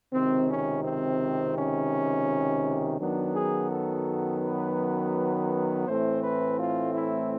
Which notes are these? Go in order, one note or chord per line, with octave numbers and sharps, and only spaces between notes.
C#2 C3 D#3 C4
C#4
C4
C#4
F#2 D#3 F#3 B3 D4
G#4
A4
B4
A2 E3 A3 C4 C5
B4
F4
E4